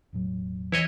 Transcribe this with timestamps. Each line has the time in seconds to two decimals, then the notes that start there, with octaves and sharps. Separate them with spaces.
0.13 E1 A2 F#3
0.72 E3 E4 C#5 D#5